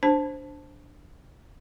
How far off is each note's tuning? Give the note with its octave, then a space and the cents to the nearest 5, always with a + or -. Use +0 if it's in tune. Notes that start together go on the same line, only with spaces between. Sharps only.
D4 -5 C5 +0 A5 +0